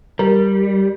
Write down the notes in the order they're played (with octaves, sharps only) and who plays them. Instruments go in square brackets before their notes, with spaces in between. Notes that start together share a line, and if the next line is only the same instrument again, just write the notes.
[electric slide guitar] G3 [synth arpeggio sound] A#4